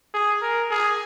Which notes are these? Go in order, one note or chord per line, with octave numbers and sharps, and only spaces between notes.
G#4
A#4
G#4